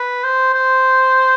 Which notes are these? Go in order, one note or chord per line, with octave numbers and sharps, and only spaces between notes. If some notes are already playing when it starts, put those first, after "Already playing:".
Already playing: B4
C5
C5